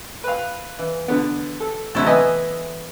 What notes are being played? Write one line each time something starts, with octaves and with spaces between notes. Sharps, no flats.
B4 F5
E3
D3 B3
A4
D2 C3 F#3 E4 A4
E3 B3 D#5 E5 G#5